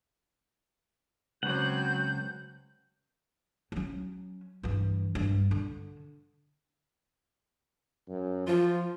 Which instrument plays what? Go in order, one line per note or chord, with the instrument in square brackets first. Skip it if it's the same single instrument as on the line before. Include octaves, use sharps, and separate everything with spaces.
[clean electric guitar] C#2 [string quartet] F#3 C4 [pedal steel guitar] F#5 [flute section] G6
[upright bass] F#3 C#4
G2 E3
G2
D3
[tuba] F#2
[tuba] F3 [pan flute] F4